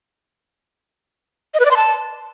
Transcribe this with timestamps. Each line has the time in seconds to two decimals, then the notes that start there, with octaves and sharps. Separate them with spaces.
1.54 D#5
1.60 B4
1.65 D5
1.71 C6
1.77 A5